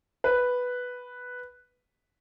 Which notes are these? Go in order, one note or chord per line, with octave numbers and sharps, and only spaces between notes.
B4